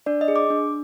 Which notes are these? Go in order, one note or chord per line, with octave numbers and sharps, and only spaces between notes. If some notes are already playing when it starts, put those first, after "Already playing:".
D4 D5
D#5
G#4
D6
D4